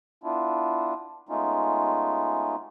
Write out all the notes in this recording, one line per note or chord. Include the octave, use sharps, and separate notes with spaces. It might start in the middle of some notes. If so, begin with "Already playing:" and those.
B3 D4 E4 F4
G#3 A3 B3 C#4 D#4 F4